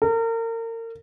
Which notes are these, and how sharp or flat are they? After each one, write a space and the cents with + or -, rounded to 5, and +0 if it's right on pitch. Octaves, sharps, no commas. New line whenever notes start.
A#4 -35